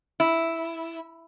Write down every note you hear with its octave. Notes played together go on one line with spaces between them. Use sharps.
E4